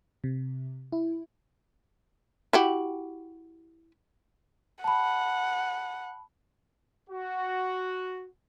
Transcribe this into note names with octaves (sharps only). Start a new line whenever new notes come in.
C3
E4
E4 F#4 G4
F#5 A5 B5
F#4